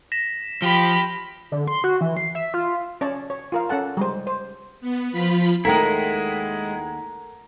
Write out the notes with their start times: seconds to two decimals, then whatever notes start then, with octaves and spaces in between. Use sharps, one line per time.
0.12 A#6 B6 E7
0.62 F3 G4 B5 G7
1.52 D3
1.68 C6
1.84 F#4
2.01 E3
2.17 C7
2.35 E5
2.54 F4
3.01 C#4 C#5 D5 A5
3.30 C#5
3.52 F4 A#4 F5
3.69 C#4 A4 F#5 A5
3.97 G3 G#3 C5
4.27 C5
4.81 B3
5.11 F3 F4 B5 B6
5.65 D#2 G#3 A3 E4 A#4 F#5 G5 A#5